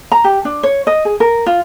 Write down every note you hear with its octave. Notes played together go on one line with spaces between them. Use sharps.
A#5
G4
D4
C#5
D#5
G#4
A#4
F4